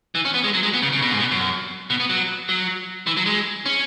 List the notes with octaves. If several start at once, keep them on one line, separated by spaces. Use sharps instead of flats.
E3
C#4
B3
G#3
F#3
G#3
B3
C#3
C#3
B2
G#2
B2
F#2
B2
B3
F#3
F#3
E3
F#3
G#3
C#4